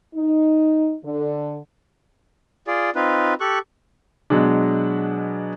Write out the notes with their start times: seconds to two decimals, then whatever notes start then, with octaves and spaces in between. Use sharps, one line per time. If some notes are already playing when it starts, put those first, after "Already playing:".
0.14 D#4
1.04 D3
2.67 F4 G#4 D5
2.95 C4 D#4 F4 B4
3.40 G4 A4 C#6 F#6
4.30 B2 F#3 G#3 D4